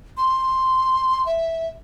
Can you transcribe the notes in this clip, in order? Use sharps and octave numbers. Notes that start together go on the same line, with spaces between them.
C6
E5